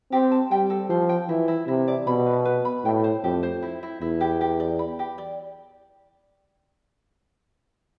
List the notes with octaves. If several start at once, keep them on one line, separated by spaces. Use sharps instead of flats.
C4 G4
A5
G3 G5
A4
F3 C5
G5
E3 E4
E4
C3 E4
D5
B2 B5
B4
B4
B5
A2 G5
C5
F2 G4
C5
E4
E4
E2 E4
G4
G4
D5
B5
G4
D5